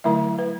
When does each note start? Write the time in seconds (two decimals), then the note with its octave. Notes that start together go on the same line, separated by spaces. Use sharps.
0.04 D3 F#3 A3 E4 E5
0.39 B4